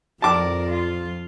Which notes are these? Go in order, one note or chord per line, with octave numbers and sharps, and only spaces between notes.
F2 F3 A#4 D5 A5 D6
F4